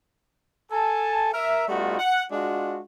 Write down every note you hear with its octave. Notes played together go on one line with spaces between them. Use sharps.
A4 G#5 A5
A#4 E5
G3 A3 B3 D#4 F4 F#4
F#5
G#3 D4 F4 F#4